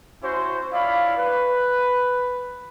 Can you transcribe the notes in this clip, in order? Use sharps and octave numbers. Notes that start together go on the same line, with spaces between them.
C#4 E4 F#4 C5
E4 F4 C#5 D5 F5 B5
B4